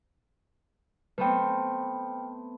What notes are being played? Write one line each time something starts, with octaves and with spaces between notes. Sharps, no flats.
A3 B3 C4 B4 G5